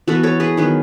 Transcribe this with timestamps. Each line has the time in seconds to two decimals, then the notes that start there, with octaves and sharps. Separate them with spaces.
0.07 E3 B3 F#4 A4
0.23 A4 C#5
0.40 G#4 B4
0.57 D#3 F#3 B3